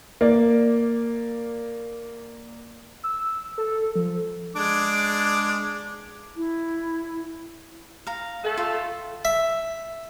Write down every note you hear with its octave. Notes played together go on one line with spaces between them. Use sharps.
A#3 D5
E6
A4
F3
G#3 D4 D6
E4
F5 A#5
A2 A3 A4
F4
E5